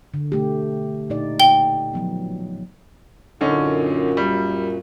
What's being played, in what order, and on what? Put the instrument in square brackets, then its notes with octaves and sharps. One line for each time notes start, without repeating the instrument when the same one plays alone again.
[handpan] D3
B2 A3 G4
A#2 D#4 D5
[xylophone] G5 G7
[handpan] F3 F#3 B3
[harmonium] F#2 A#2 [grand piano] D3 C#4 D#4
[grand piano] G3